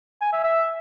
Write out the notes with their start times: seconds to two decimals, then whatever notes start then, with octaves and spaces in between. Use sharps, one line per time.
0.21 G#5
0.32 E5
0.44 E5